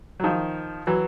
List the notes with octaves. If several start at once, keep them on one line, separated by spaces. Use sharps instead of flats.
F#3
D#3 F3
E3 F#3